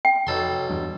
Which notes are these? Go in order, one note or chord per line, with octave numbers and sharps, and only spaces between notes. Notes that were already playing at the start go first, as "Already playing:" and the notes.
G5
F1 B1 A4 C6
E2 G2